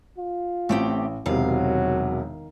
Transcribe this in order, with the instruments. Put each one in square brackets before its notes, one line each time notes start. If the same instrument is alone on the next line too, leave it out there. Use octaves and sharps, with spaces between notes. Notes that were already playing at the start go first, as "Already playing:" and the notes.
[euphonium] F4
[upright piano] A1 [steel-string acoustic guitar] A3 C4 G4
[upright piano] E1 C3 [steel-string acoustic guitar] D#3 F5 [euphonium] F#3